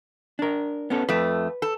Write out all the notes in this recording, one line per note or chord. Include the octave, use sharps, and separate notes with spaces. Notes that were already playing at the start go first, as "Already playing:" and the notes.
D4 A#4
B3 C#4 A4
F2 A3 B4
A4